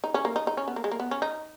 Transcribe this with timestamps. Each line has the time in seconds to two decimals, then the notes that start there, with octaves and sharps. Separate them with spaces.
0.04 D#4
0.14 C#4
0.25 A#3
0.36 D#4
0.47 D#4
0.57 C#4
0.68 B3
0.76 A#3
0.84 G#3
0.92 A#3
1.00 B3
1.11 C#4
1.22 D#4